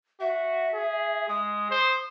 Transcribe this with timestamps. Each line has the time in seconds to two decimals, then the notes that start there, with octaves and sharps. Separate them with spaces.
0.20 F#4 E5
0.74 G#4
1.28 G#3 D#6
1.71 C5